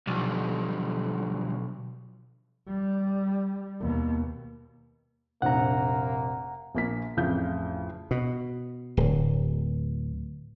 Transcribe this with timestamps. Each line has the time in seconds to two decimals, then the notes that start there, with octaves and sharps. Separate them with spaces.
0.07 B1 D3 F3 G3
2.68 G3
3.81 D#2 B2
5.42 F1 A#1 A#3 F#5 A#5
6.75 A#1 A#3 B6
7.17 A1 F2 C#3 F5 G6
8.11 B2
8.97 D1